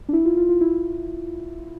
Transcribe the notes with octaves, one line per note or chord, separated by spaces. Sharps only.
D4
E4
F4
F4
F4
E4